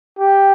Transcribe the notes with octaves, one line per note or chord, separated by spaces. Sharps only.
G4